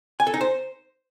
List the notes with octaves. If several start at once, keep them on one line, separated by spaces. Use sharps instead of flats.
G#5
A4
D#4
C5